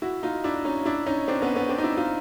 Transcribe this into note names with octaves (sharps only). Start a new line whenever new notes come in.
E4 F#4
D#4 F4
D4 E4
C#4 D#4
D4 E4
C#4 D#4
C4 D4
B3 C#4
B3 C#4
C4 D4
D#4
D4 E4
D#4 F4